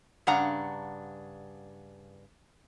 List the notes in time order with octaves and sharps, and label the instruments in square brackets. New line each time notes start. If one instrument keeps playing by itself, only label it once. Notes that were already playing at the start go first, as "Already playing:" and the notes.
[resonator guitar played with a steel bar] G2 C#3 D4 F#5 A#5